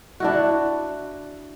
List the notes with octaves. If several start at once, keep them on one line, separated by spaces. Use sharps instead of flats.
D4 E4 F#4